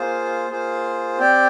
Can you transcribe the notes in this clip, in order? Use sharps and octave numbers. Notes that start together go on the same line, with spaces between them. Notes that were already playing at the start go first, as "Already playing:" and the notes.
Already playing: A#3 F4 G#4 C5
A#3 F4 G#4 C5
C4 G4 D5 G5